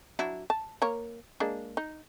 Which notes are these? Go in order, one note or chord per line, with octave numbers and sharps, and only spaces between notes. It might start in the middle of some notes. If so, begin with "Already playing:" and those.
F#3 D4 E4
A5
A#3 A#4 C#5
G#3 A#3 D4
D#4